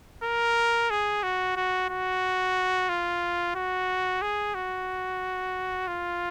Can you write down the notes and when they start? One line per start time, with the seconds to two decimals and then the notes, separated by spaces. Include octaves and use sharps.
0.24 A#4
0.91 G#4
1.23 F#4
1.56 F#4
1.89 F#4
2.89 F4
3.55 F#4
4.22 G#4
4.55 F#4
5.88 F4